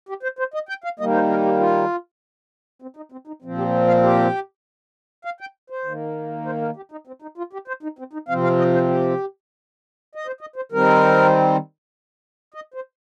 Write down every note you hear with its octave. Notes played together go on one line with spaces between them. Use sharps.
G4
C5
C5
D#5
G5
F5
D#3 G3 A#3 D#5
C5
A#4
G4
F4
C4
D#4
C4
D#4
A#2 F3 C4
G4
F5
G4
F5
G5
C5
D#3 A#3
C5
A#4
G4
D#4
C4
D#4
F4
G4
C5
D#4
C4
D#4
C3 F3 C4 F5
F5
D#5
C5
G4
D#5
C5
D#5
C5
D#3 G3 C4 A#4
D#5
C5